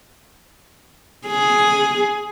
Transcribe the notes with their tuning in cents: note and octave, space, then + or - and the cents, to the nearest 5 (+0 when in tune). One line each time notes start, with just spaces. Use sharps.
G#4 +5